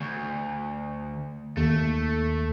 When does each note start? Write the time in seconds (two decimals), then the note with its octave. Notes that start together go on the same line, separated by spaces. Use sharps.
0.01 D2
1.57 D#2 A3